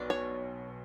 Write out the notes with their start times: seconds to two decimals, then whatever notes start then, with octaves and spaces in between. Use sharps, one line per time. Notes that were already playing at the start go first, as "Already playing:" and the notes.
Already playing: B1 B2 D4
0.10 C#5